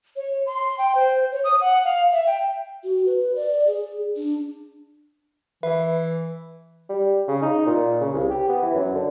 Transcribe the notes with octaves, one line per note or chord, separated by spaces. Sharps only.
C#5
C6
G5
C5
C#5
D#6
F#5
F5
E5
G5
F#4
B4
D5
G#4
D4
E3 B4 E5
G3
C#3
D#4
A#2
C#3
C2
G4
B3
E3
F#2
D3